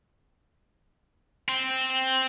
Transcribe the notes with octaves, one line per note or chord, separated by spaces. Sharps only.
C4